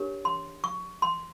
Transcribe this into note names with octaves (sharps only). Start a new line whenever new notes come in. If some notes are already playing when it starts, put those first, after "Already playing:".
Already playing: D4 G4 A#4 C#5
C6
C#6
C6